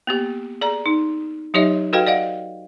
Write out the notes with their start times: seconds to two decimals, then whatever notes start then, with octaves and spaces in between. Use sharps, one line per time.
0.07 A#3 B3 G4
0.61 G#4 D5 A#5
0.86 D#4
1.54 F#3 D#4 G4 C#5 D#5 E5
1.93 F#4 A4 B4 D#5 F5 G5
2.07 D5 D#5 F5 F#5